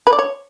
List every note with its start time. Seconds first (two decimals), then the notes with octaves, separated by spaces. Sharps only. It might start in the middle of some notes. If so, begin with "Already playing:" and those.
0.07 B4
0.13 D5
0.19 C#5